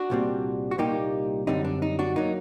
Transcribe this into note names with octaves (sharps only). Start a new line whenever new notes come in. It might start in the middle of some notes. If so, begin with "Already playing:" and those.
Already playing: D4 F#4
C2 A#2 G3 C4
F#4
C2 A#2 G3 A#3 D#4 G4
F#2 D3 G3 C4 D#4
D4
D#4
D4 F#4
F#3 A#3 D#4